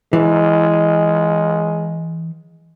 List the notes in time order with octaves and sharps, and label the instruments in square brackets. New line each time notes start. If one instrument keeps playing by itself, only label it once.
[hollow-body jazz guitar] E3 [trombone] G#3